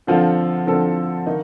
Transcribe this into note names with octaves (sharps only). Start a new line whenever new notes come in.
D3 F3 C4 F4 A4
D3 F3 C4 F4 A4
D#3 A#3 D#4